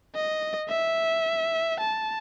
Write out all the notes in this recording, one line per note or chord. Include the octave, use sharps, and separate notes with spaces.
D#5
E5
A5